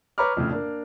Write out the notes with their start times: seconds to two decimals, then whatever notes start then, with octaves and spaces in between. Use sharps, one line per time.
0.18 B4 C#5 A#5 B5 D6 F6
0.37 F2 A2 C#3
0.51 A#3 D4